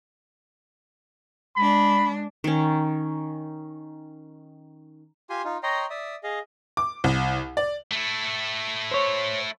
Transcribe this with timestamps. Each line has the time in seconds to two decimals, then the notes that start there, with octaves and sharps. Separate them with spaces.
1.56 G#3 D4 B5
2.44 D#3 C#4
5.30 F4 G4 G#5 C6
5.44 D#4 F4
5.63 C#5 D#5 G5 A#5 C6
5.90 D5 E5 D#6
6.23 G#4 D#5 F5
6.77 D6
7.04 C2
7.57 D5
7.92 A3 E4
8.91 C5 C#5